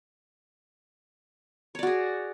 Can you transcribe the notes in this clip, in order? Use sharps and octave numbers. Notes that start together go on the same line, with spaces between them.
F#4 G#4 C#5 D5